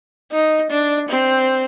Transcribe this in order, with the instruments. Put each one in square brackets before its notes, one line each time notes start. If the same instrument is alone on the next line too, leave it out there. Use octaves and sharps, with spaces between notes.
[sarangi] D#4
D4
C4